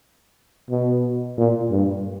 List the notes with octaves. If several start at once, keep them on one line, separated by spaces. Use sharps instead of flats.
B2
A#2
G2